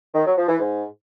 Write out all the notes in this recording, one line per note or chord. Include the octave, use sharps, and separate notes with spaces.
D#3
F#3
F3
E3
G#2